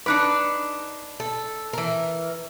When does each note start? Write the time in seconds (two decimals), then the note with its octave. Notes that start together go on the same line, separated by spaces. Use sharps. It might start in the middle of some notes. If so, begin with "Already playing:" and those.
0.06 D4 D#4 B4 D6 F#6 C#7
1.20 A4
1.73 E3 A#4